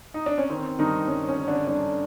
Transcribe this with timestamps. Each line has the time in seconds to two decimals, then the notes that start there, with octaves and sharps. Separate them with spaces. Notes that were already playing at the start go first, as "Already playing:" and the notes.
0.14 D#4
0.26 D4
0.38 C#4
0.50 D#3 C4
0.79 G2 D#3 D#4
1.08 G2 C#4
1.28 C#4
1.38 D#3
1.48 D3 D4
1.67 G2 D3 D4